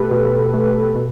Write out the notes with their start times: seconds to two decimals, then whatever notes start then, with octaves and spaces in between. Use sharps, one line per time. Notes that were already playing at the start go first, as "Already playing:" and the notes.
Already playing: B2 A3 G4 A4 B4
0.11 B2
0.54 A3
0.96 B2